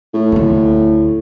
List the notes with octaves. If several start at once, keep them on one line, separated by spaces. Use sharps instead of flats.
A2
D2 D3